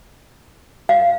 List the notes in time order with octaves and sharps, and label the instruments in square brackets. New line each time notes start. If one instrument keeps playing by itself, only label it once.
[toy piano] F5